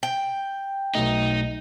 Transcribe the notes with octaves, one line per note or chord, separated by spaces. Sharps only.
G5
B1 B2 A3 D#4